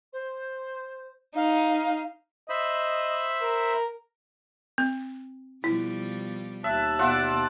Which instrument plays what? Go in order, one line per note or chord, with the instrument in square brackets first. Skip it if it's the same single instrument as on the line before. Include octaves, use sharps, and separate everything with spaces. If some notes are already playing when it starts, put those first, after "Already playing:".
[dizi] C5
[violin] D#4 [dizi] F5
[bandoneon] C5 E5 B5 [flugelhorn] D#5
[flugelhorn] A#4
[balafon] C4
[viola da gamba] B2 F3 G3 [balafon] E4
[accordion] D#2 A5 F#6 [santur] E5
[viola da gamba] B2 D5 [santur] F4 E5 F#5